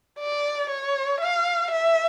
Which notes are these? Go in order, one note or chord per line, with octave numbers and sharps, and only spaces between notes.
D5
C#5
F5
E5